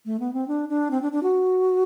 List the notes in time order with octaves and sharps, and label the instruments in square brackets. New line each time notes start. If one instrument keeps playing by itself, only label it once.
[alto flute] A3
B3
C4
D4
D4
C4
D4
D4
F#4